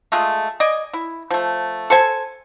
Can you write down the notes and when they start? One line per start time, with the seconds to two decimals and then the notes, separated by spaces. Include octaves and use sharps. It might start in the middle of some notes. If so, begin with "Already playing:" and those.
0.12 G#3 A3 F4 G#4
0.60 D5 D#5 G#5
0.93 E4
1.30 F3 A3
1.90 A4 C5 G#5